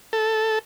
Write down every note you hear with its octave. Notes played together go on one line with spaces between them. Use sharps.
A4